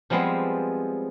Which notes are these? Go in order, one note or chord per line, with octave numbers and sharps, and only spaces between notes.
F3 G3 G#3 B3 C4